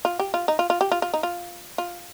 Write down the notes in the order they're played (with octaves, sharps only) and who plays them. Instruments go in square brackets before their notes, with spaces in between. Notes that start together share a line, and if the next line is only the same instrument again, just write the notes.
[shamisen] F4
G4
F4
D#4
F4
F4
G4
F4
F4
D#4
F4
F4